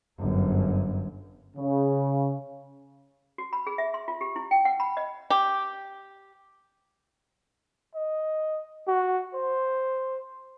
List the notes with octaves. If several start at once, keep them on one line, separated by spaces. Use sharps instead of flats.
G1 F#2
C#3
F#4
B5
G#4
E5
C6
F4
G4
E4
G5
F#5
B5
D#5
G4
D#5
F#4
C5